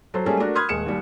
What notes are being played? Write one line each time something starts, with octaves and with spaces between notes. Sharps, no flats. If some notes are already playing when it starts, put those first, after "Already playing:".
F#3 A4 C5
G3 G#3 A#3 C#4 G#4 A4
A3 D4 F#4 A#4
B5 C6 D#6 F6 F#6 G#6
D#1 G#3 C#7 E7
D#2 G3